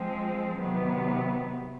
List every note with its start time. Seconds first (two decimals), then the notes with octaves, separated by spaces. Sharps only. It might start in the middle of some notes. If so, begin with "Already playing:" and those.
Already playing: F3 G#3 C4
0.59 C3 D#3 F#3 B3